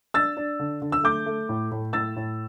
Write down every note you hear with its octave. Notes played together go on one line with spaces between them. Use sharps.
D4 E6 A6
D4
D3
D3
E6
A3 D6 G6
A3
A2
A2
A2 E6 A6
A2